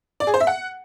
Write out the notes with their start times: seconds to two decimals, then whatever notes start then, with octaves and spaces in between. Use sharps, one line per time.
0.20 D5
0.27 G#4
0.34 C5
0.40 E5
0.47 F#5